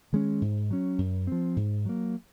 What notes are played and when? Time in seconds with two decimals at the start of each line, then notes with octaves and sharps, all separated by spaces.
0.13 D#3 G#3 C#4
0.42 G#2
0.71 F#3 C#4
0.98 F#2
1.27 F3 C4
1.56 G#2
1.85 F#3 A#3